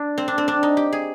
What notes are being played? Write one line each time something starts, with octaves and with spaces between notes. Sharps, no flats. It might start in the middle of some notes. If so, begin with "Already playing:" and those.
Already playing: D4
C4
D4
C4
D4
D#4
G4
G#4